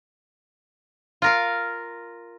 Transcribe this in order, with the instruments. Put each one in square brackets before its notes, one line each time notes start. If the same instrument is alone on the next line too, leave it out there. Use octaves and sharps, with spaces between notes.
[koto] F4 A#4 F5